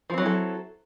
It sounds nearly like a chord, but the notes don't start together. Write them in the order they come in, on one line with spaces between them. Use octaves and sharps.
F3 C4 F#3 E4 A4